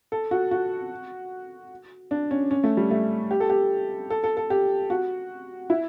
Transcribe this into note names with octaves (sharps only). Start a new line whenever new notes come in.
A4
F#4
F#4
D4
C#4
C#4
A3
G3
A3
G4
A4
G4
A4
A4
A4
G4
F#4
E4